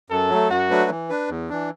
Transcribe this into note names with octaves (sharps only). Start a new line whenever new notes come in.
F#2 A4
F#3 A3
F#2 F#4
F#3 A3 D4 B4
E3
D4 B4
E2
E3 D4